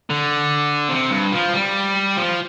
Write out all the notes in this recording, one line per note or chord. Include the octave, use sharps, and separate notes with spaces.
D3
C3
G2
F3
G3
F3